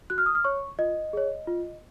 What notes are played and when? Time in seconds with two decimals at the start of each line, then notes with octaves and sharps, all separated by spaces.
0.10 F#4 F#6
0.18 F6
0.26 D#6
0.35 F6
0.44 C#5 C#6
0.79 F4 D#5
1.13 G#4 C#5
1.47 F4